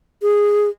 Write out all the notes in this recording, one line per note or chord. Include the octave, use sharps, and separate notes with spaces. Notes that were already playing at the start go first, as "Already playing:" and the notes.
G#4